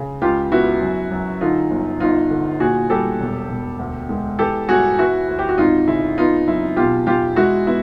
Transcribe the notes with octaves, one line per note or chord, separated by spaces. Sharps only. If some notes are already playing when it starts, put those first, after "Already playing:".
Already playing: C#3
C#2 F4 G4
B3 E4 F#4
F#2
F#2
D3 D#4 F4
G1
G1 D#4 F4
D3
A#2 F#4 G#4
G3 G4 A4
E1
E1
D2
G#3
E3 G4 A4
G1 F#4 G#4
E3 E4 F#4
D2
G4
F#4
G#1 D#4 F4
C#3 E4
B3 D#4 F4
F#2 E4
B2 F4 G4
E2 F4 G4
G#3 E4 F#4
B3 E4